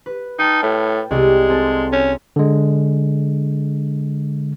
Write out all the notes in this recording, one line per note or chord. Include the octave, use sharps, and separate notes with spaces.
B4
D#4 G5 A5 F6
A2 G5
C2 G#3 D5
C4 G#4 A4
C#4
D3 G#3